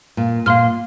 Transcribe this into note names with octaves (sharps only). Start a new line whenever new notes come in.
A#2
A#2 F5 C6 F6